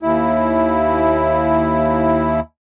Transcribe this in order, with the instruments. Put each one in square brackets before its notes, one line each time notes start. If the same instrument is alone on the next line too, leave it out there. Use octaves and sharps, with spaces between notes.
[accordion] D#2 E4